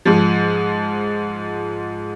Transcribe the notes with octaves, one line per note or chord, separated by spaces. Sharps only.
G#2 F3